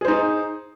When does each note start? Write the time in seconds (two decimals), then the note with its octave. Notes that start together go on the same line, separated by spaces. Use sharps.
0.01 G#4
0.05 C5
0.08 D#4